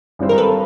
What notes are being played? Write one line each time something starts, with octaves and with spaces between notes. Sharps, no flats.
G#1 G2 E3 G3 C4
A#4
A4 B4